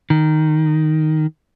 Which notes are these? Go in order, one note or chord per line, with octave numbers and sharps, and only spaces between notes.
D#3